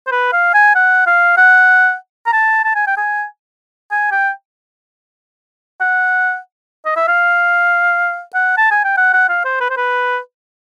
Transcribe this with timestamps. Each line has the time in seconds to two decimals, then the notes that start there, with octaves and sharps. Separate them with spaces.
0.07 C5
0.12 B4
0.33 F5
0.54 G#5
0.75 F#5
1.07 F5
1.38 F#5
2.27 A#5
2.33 A5
2.65 A5
2.75 G#5
2.87 G5
2.97 G#5
3.92 G#5
4.12 G5
5.81 F#5
6.86 D#5
6.96 E5
7.08 F5
8.35 F#5
8.58 A5
8.71 G#5
8.84 G5
8.97 F#5
9.14 F#5
9.29 F5
9.45 C5
9.61 B4
9.70 C5
9.77 B4